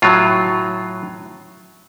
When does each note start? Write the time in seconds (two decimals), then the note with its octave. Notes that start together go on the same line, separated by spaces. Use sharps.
0.02 A2 F#3 F4